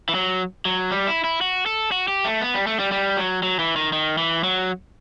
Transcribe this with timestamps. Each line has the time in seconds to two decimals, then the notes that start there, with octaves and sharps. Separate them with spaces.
0.09 E3
0.15 F#3
0.65 F#3
0.91 G3
1.07 E4
1.24 E4
1.41 F#4
1.66 A4
1.92 F#4
2.08 G4
2.24 A3
2.41 B3
2.54 G3
2.67 A3
2.79 G3
2.92 G3
3.17 F#3
3.43 F#3
3.59 E3
3.76 D#3
3.93 D#3
4.18 E3
4.44 F#3